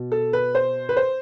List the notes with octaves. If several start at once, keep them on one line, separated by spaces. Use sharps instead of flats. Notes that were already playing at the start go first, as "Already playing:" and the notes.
Already playing: B2
A4
B4
C5
B4
C5